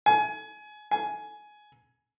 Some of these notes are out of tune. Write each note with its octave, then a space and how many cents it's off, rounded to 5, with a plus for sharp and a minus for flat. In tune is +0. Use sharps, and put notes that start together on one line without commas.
G#5 +25
G#5 +15